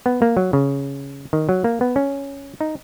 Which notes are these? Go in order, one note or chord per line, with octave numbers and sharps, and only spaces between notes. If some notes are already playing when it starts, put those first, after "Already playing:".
B3
A#3
F#3
C#3
D#3
F#3
A#3
B3
C#4
D#4